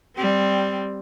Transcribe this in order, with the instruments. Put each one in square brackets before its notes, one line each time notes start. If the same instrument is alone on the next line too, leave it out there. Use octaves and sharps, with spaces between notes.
[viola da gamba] G3 C4